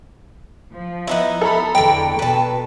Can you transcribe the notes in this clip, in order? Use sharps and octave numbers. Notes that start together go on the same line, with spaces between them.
F3
B3 D#4 E4
A4 A#5 B5
E2 B2 D3 G5
B2 B4 A5